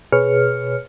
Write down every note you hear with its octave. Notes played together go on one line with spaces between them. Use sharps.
B2 G#4 B4 C#5 F6 C#7